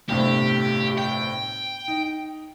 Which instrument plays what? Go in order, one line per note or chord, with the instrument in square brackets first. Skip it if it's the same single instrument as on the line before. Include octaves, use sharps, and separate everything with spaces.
[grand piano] G1 A2 C3 [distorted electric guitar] G4
[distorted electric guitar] G5
[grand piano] D#4